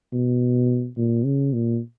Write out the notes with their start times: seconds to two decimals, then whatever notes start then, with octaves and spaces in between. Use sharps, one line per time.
0.12 B2
0.97 A#2
1.25 C#3
1.53 A#2